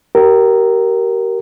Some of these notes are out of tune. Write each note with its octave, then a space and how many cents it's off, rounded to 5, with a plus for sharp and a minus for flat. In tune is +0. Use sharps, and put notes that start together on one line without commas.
G4 -35 A#4 +0